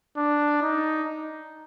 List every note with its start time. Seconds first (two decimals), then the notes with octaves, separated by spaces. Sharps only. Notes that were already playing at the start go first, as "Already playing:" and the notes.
0.17 D4
0.62 D#4